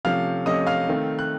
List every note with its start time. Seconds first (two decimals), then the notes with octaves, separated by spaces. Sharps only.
0.05 C3 F3 A3 C#4 F5 F6
0.46 C3 F3 A3 C#4 D#5 D#6
0.67 F5 F6
0.88 D#3 A3 C4
1.19 F#6